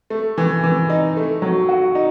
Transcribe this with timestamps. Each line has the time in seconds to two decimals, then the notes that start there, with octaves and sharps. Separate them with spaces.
0.10 A3
0.38 E3
0.64 E3
0.90 D#4
1.17 A3
1.42 F#3
1.69 F#4
1.95 D#4